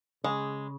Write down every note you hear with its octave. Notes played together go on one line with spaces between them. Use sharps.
C#3 G#3